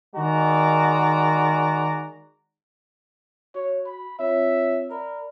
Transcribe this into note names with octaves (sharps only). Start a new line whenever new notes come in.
D#3 G#3 F#4 D5 A#5
F#4 C#5
B5
C4 F4 C#5 E5
A#4 D5 B5